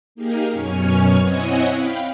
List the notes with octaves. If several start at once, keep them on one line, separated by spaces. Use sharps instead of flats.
A#3 D#4 G4 G#4 A#4
F#2 B2 C#4 G#5 C#6 F6
C4 E4 C#5 D#5 F#5 G#5
F5 G5 B5